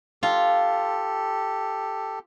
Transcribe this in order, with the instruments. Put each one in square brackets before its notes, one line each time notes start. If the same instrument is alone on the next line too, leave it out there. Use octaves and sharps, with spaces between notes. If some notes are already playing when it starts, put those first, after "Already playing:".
[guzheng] F4 [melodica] G4 A4